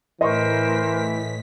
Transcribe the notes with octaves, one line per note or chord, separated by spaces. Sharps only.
A2 E3 A#4 C5 D#5 C6 C#6 B6